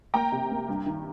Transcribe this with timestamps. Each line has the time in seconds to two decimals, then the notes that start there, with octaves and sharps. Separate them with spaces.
0.14 A#3 G5 A#5
0.32 C3
0.50 A#3
0.68 G2
0.86 D#3